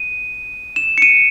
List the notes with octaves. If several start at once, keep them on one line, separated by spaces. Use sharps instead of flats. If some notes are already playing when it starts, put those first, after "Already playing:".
Already playing: D#7
E7
C#7
D#7